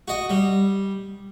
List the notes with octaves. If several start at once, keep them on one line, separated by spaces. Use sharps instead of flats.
F#4 D#5
G3